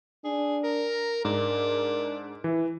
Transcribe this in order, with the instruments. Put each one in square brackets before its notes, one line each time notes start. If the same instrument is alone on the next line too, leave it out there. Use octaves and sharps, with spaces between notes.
[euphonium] D4 [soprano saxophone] G#4
[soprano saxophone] A#4
[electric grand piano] G#2 [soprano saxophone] D4 [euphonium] A#4
[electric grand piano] E3 [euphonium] E4